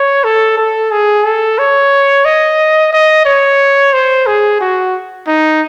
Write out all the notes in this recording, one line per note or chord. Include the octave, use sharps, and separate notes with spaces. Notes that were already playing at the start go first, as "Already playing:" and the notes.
Already playing: C#5
A4
A4
G#4
A4
C#5
D#5
D#5
C#5
C5
G#4
F#4
D#4